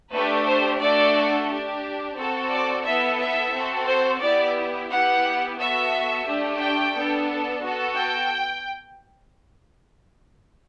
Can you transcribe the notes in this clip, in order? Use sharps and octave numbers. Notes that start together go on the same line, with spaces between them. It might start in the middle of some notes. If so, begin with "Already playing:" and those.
A3 D4 G4 B4
C5
A3 D4 F#4 A4 D5
D4 G4
C4 F#4 A4
D5
B3 E4 A4 E5
E5
C4 F#4 A4
C5
B3 E4 G4 D5
B3 E4 G4 F#5
B3 F#4 A4 E5
A3 D4 G4
G5
B3 D4 A4
B3 F#4 A4
G5